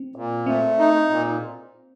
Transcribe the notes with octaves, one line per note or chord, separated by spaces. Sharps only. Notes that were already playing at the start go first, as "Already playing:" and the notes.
Already playing: C4
A#2
A3 C4
D#4
A#2